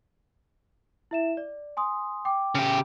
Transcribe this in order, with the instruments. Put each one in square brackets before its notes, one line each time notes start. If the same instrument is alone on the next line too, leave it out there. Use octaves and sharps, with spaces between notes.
[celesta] E4 E5 E7
D5
G#5 C6 D#6
G5 D6
[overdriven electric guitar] C#3 G4